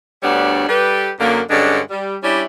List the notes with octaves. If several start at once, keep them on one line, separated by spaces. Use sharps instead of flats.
D2 G3 B3 D4 C#5
G3 G4 A4 B4
F#2 D3 A#3
G2 D3 G#3 C#4 D4
G3
G3 C#4 D4 E4